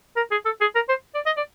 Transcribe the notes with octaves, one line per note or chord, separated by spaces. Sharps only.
A#4
G#4
A4
G#4
A#4
C5
D5
D#5
D5